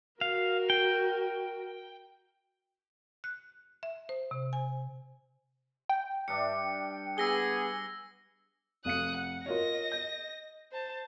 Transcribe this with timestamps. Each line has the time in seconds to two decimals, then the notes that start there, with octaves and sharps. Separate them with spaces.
0.21 F#4 A#4 F5
0.70 G5
3.24 F#6
3.83 E5
4.09 C5
4.31 C3
4.53 G#5
5.89 G5
6.28 G2 D4 E5 C#7
7.18 B3 G#4 E6 A#6 G7
8.85 F1 F5 D#6 F#6 C#7
9.17 F#5
9.46 F4 A#4 C#5 D#5 A#6
9.92 G6
10.72 C5 A5